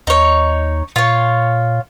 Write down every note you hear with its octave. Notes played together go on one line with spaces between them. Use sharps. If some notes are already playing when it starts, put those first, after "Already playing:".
D#2 D#4 C#5
A#2 F4 C#5